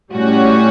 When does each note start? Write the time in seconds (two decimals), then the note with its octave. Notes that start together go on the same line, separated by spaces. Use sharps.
0.13 A2 G3 C#4 F#4